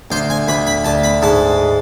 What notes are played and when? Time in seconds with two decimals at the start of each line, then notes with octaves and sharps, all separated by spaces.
0.11 D2 C5
0.30 G#5
0.48 D2 B5
0.67 B5
0.85 D2 A5
1.04 B5
1.22 G#2 A5